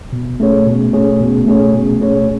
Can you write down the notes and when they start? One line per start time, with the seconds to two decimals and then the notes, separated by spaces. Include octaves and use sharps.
0.13 B2
0.40 A3 C#4 G#4 C#5
0.67 B2
0.93 A3 C#4 G#4 C#5
1.20 B2
1.47 A3 C#4 G#4 C#5
1.74 B2
2.00 A3 C#4 G#4 C#5